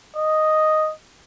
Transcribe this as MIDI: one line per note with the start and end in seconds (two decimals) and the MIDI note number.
0.16 0.92 75